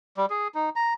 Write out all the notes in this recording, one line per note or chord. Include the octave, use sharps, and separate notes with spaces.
G3
G#4
D#4
A#5